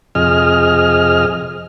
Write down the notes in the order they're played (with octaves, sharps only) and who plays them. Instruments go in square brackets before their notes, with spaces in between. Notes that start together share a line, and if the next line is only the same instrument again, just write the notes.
[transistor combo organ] F2 C3 G#4 D#5 F6